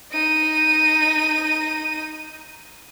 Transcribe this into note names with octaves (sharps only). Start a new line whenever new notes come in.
D#4 D#7